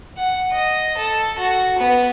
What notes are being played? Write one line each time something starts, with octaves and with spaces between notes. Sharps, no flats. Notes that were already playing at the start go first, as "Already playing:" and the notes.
F#5
D#5
A4
F#4
B3